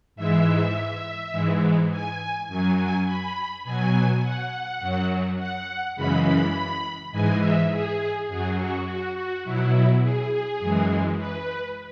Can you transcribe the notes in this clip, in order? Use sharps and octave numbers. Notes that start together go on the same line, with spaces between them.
G#2 E3 G#3 E5
G#2 E3 G#3
G#5
F#2 F#3 G#5
G#5
B5
B2 F#3 G#5
F#5
F#2 F#3
F#5
F#2 C#3 E3 G#3 B5
B5
G#2 E3 G#3 G#5
E5
G#4
F#2 F#3 G#4
F#4
F#4
F#4
B2 F#3 E4
G#4
F#2 E3 G#3
B4